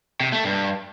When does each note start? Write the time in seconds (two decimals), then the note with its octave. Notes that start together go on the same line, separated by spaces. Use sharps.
0.20 C3
0.32 A3
0.44 G2